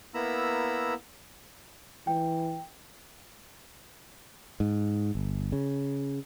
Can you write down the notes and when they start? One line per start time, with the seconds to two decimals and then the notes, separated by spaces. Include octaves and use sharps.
0.14 A#3 B3 E4 A#5 B5 E6
2.07 E3 G5
4.60 G#2
5.15 G1
5.52 C#3